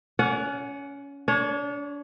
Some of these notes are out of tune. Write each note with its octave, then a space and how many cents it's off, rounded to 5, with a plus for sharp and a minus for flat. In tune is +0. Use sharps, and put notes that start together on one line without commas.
C#4 +20 D5 -40 F#5 +0
D4 -35 C#5 +0